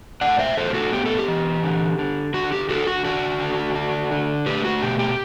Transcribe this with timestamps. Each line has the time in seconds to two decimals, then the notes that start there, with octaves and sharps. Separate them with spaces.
0.21 A2 D5 F#5
0.39 C5 E5
0.57 A2 A4 C5
0.70 G4
0.74 F#4 A4
0.92 B3 G4
1.06 A4
1.18 G4
1.28 E3
1.63 D3
1.99 D3
2.34 D3 F#4
2.52 G4
2.69 D3 F#4 A4
2.87 F#4
3.05 D4 F#4
3.41 D3
3.75 D4
4.11 D3
4.46 A3 G4 B4
4.65 F#4
4.82 B2 G4
4.99 G4